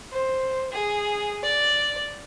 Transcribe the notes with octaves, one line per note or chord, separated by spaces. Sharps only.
C5
G#4
D5